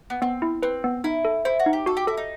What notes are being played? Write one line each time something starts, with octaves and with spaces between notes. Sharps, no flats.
B3
B3 C4
E4
C4 B4
B3
D#4 E4
A4
E4 C5
F#4
D#4
G4
F#4 A4
G4
E4 A4
D#4